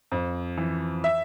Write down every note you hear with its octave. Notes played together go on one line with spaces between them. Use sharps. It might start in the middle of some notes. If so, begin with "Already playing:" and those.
F2
E3
E5